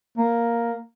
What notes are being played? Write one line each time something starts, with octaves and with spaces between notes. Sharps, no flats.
A#3